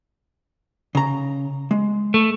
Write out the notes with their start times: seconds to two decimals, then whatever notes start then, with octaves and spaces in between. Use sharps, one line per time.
0.95 C#3 A#5
1.71 G#3
2.14 A3